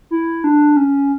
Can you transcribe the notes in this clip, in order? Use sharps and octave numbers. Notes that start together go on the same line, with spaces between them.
E4
D4
C#4